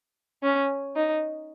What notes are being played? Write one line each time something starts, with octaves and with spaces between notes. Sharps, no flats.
C#4
D#4